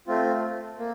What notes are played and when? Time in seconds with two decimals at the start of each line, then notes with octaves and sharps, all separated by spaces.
0.07 A3 C4 F4
0.79 A#3